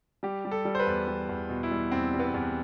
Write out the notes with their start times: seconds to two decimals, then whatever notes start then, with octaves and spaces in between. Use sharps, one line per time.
0.23 G3 G4
0.45 G3
0.51 A4
0.65 G3
0.75 C5
0.80 B4
0.86 E2
1.07 G3
1.29 E2
1.49 B2
1.63 E4
1.71 G3
1.92 E2 C4
2.14 G3
2.19 B3
2.34 E2